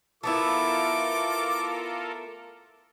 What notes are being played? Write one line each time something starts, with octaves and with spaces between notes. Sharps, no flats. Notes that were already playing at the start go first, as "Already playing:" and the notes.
A3 B3 E4 F4 A4 A#4 D6